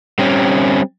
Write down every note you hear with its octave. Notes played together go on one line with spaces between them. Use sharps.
G3 C4 C#4